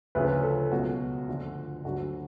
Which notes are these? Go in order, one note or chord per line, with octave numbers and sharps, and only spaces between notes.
D2 C#3 F3 B4
A4
C#2 B2 F#3 F#4
D2 D3 F3
D2 D3 F#3 F#4